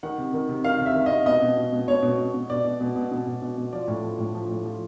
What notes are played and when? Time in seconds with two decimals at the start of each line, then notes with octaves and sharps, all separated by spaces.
0.03 D#3 F#5
0.18 C3
0.34 D#3
0.49 C3
0.64 D#3 F5
0.79 C3
0.86 E5
0.95 D#3
1.06 C3 D#5
1.26 B2 D#5
1.42 B2
1.57 B2
1.72 B2
1.88 B2 C#5
2.03 B2
2.19 B2
2.34 B2
2.50 B2 D5
2.65 B2
2.81 B2
2.96 B2
3.11 B2
3.26 B2
3.42 B2
3.58 B2
3.73 F3 D5
3.88 A2
4.03 F3
4.18 A2
4.34 F3
4.49 A2
4.65 F3